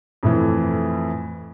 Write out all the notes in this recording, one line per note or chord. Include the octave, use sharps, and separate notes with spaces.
F2 A2 E3